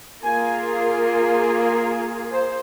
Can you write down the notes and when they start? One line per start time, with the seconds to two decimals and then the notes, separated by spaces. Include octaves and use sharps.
0.24 A#3 F4 G#4 G#5
1.63 A#4
2.32 C5